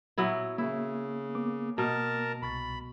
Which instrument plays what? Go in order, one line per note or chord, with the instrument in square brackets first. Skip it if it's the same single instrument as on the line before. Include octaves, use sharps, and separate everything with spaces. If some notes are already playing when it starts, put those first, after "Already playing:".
[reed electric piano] A#2 [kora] F#3 B3 E4
[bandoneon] C#3 [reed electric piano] A#3 [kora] E4
[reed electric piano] A#3 B3 D6
[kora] B2 [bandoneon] A#4 A5 A#5
[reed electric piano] C2 C#6 A6 [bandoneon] B5